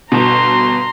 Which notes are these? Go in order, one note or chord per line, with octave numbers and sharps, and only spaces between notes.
G1 B2 A#5 C6